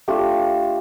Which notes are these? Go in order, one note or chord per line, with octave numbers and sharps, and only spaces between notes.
A3 D4 F4 G4